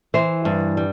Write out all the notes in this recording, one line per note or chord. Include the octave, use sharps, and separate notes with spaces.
E3 C5
G2
G3